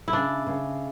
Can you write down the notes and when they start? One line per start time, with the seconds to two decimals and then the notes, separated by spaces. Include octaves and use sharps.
0.08 E4
0.13 C#3 D4
0.47 C#3